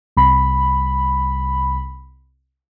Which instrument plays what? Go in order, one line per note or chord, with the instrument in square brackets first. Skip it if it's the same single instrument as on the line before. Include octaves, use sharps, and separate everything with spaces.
[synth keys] C2 B5